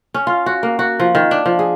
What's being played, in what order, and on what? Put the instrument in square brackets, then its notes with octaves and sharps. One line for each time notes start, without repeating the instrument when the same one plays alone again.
[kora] C#4
F4
F#4
A#3
F#4
F3
D#3
D4
F3
G#4